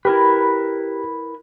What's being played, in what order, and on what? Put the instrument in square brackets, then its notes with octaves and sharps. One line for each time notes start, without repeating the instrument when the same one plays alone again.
[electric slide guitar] E4 A#4 B4 [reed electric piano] G4